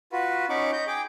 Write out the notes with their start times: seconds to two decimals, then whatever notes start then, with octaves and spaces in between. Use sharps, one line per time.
0.12 F4 F#4 B4
0.49 C#4 D#4 B5 C#6 D6
0.73 D#5 G6
0.87 G#4 G5 D6